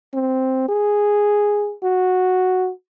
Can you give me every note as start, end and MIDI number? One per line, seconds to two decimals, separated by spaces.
0.14 0.65 60
0.69 1.73 68
1.84 2.70 66